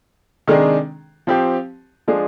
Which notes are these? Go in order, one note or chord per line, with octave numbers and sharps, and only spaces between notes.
C3 D#3 G#3 D4 G#4
F3 C4 G4
F3 G#3 D4 G#4